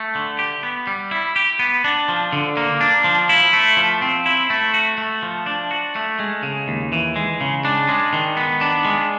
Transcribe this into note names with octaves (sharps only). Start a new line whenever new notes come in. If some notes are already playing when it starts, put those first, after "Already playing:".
Already playing: A3
D3
G4
B3
G3
E4
G4
B3
D4
F3
D3
A#3
D4
F3
E4
A3
F3
C4
E4
A3
F#4
A3
F3
D4
F#4
A3
G#3
C#3
D#2
E3
G#3
C#3
D4
G#3
D#3
B3
D4
G#3